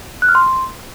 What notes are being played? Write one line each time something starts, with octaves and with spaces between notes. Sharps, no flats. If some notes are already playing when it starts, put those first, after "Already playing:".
F#6
F6
C6